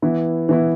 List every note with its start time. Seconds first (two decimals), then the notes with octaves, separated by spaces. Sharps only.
0.02 E3 B3 E4
0.49 E3 B3 E4